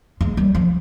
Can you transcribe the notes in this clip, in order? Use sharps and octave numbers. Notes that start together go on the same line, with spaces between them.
G#3
G3
F3